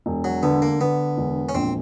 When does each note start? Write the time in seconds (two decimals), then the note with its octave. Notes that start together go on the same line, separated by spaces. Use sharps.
0.06 E1
0.24 F#3
0.43 D3 B3
0.62 A#3
0.80 D3 B3
1.17 E1
1.49 C#4
1.54 A#1 C4